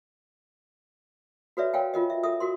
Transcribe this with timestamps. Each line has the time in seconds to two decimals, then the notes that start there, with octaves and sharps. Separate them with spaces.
1.57 F#4 A4 B4 C#5 D5 E5
1.73 A#4 C#5 F5 G5 G#5
1.94 F4 A#4 D#5
2.10 E5
2.23 A4 A#4 E5 D#6
2.40 F#4 A#4 C6